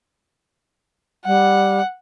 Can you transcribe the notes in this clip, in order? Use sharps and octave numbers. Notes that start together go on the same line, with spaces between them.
G3 F#5